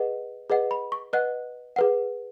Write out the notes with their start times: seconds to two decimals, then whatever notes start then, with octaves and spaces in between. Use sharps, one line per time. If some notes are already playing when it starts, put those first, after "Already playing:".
Already playing: G#4 B4 D#5 F#5
0.50 G#4 B4 D#5 F#5
0.71 B5
0.92 C#6
1.13 B4 D#5 F#5 F#6
1.76 G#4 B4 F#5